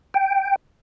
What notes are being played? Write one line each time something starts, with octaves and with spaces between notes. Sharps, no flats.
G5